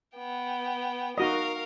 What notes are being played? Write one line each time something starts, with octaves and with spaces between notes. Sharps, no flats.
B3 G5
D#4 F#4 A#4 D#5 F5